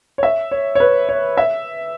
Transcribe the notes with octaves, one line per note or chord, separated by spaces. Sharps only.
C#5
E5
C#5
C#5
B4
C#5
E5